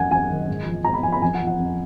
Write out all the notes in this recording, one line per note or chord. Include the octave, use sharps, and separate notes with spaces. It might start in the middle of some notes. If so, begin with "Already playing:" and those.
Already playing: F#2 F#3 F#5 G#5
F#2 G#5
D#3
G#2
F3
G#2 A#5
B5
F3 G#5
B5
F2 G#5
F#5
F3
F#5
F2